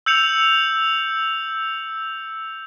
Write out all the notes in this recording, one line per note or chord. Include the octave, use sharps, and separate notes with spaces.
E6 G6 C#7 F7